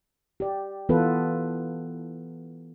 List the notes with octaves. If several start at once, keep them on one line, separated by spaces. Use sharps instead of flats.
G4 D5
E3 B3 F4 A4 B4